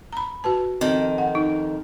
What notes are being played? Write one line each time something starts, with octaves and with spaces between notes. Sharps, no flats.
A#5 B5
F#4 B4 A5
F2 D#3
F#5
D#4